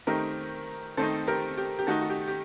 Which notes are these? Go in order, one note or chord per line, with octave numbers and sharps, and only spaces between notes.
D#3 A3 C4 D#4 G4 A#4
D#3 A3 C4 D#4 A4 C5
G4 A#4
G4
G4
D#3 A3 D#4 F#4 A4
F#4
G4
G4